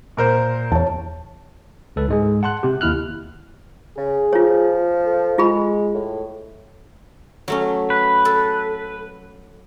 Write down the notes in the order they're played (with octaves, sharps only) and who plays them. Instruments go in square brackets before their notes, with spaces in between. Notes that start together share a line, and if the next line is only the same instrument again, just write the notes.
[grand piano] A#2 A#4 C5
[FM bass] E2 [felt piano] C#5 A5
[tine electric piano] C#2 A4 B4
G#2 G#3 G#4
F#5 A5 C6 F#6
C3 G4
D#2 E4 F6 F#6
[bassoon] C#3 [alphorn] G#4
[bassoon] F3 [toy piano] F4 C#5
[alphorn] A4
[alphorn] G#3 [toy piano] F4 G#4 B5
[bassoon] A2
[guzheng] F#3 A3 C#4
[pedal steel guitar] B4
[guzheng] A4